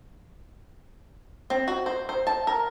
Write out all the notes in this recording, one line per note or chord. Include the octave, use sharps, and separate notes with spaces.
C4
F#4
C5
C5
A5
A#4